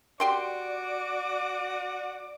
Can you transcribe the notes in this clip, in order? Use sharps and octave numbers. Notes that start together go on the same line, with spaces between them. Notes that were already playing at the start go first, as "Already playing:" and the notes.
F#4 G4 D5 G5 C6 D6